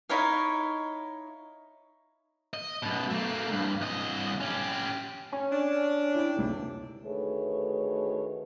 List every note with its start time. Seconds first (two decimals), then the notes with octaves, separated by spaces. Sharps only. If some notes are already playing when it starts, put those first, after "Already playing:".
0.09 D#4 E4 C#5 F5
2.53 D#5
2.83 F#2 B2
3.10 A3 A#3
3.52 C2 G2
3.81 C2 D#5
4.41 C#4 G4
5.32 C#4 G#5
5.52 D4
6.15 E4 G5
6.36 C#2 C3 D#3
7.05 D2 D#3 A3 G#4 B4 C#5